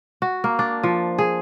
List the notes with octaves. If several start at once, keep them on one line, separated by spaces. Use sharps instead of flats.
F#4
A#3
D4
F3
G#4